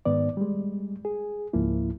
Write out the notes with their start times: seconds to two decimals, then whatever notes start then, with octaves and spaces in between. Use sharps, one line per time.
0.05 G#2 D#3 B3 D5
0.37 G3 G#3
1.05 G#4
1.53 C#2 G#2 F3 A#3 E4